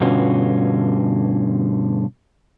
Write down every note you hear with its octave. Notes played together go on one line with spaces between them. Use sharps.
G2 B2 D3 C#4 F4 F#4